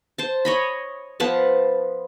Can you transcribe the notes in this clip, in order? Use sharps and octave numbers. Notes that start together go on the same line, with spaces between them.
C5 A5
C#5 D#5 B5
F3 B3 B4 A5